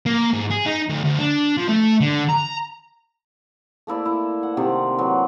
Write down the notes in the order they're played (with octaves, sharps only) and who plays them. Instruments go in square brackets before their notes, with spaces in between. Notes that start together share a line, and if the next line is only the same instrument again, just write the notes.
[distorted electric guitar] A#3
G#2
G#4
D#4
D2
D2
D4
F3
A3
D3
A#5
[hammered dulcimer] A3 A#3 E4 D5
E4
F#5
C3 D#3 D5
E3 F#3